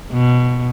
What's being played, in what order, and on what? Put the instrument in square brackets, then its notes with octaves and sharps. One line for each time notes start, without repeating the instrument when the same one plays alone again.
[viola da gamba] B2